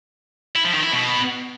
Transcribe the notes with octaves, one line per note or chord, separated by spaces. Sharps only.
E4
F3
D#3
E4
B2